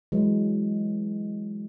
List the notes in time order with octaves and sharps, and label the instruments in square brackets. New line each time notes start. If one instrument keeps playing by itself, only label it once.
[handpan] E3 F#3 G#3